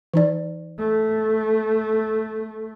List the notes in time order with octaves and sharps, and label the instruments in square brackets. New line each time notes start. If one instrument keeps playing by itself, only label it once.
[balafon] E3 D#4 D5
[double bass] A3